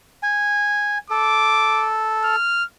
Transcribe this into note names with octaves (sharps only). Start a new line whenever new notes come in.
G#5
A4 D6
F6